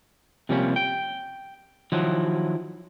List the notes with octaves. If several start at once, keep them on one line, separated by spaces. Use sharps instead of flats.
C3 F3 G3 A#3 C#4
G5
D#3 F3 F#3 E4